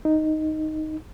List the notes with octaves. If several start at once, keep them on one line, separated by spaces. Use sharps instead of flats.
D#4